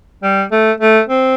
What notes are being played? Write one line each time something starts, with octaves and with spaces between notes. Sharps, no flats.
G3
A3
A3
C4